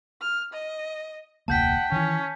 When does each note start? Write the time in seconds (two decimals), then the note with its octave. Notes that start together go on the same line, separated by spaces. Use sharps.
0.21 F6
0.53 D#5
1.48 E1 C#2 A#3 F#5 G5 A5 G6 B6
1.92 D#3 E3 C#4